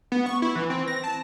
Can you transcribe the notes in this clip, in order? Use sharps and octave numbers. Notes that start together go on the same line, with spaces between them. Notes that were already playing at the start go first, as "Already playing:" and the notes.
B3
C#6
E4
E3
C4
A#6
A5